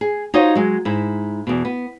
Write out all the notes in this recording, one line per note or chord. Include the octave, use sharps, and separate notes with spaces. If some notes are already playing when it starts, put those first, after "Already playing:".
G#4
D#4 F4 F#4 C5 C#5 D#5
F#3 G#3
G#2 E4
E2 B2
B3